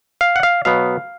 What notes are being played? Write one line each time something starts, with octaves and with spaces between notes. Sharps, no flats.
F5
F#5
F5
B2 F#3 B3 F5